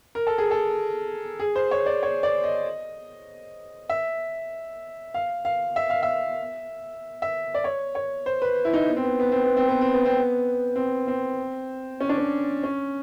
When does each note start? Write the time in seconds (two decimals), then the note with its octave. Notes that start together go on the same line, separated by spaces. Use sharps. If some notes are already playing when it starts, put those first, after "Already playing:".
0.15 A#4
0.27 A4
0.38 G#4
0.51 A4
1.40 G#4
1.56 C5
1.71 C#5
1.86 D5
2.03 C#5
2.23 D5
2.44 D#5
3.89 E5
5.14 F5
5.45 F5
5.76 E5
5.90 F5
6.03 E5
7.22 E5
7.55 D5
7.64 C#5
7.95 C#5
8.26 C5
8.42 B4
8.65 E4
8.73 D#4
8.89 B3
8.96 C4
9.03 B3
9.20 B3
9.32 C4
9.44 B3
9.57 C4
9.69 B3
9.81 C4
9.94 B3
10.06 C4
10.18 B3
10.76 C4
11.08 C4
12.00 C#4
12.09 D4
12.18 C#4
12.64 C#4